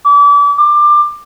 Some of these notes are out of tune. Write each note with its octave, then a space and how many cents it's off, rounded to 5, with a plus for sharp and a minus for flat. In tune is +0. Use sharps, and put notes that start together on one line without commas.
D6 -35
D6 +20